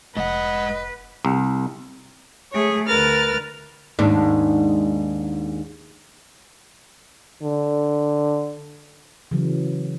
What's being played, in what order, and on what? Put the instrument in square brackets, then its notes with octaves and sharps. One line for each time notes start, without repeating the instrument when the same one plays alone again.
[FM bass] F1 [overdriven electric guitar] G#2 F#5 [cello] B4 [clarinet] D#5
[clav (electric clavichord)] C2
[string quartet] A3 G#4 C#5
D2 A#4 B4 F6 A6
[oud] D#2 G#2 D4
[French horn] D3
[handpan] C#3 E3 F#3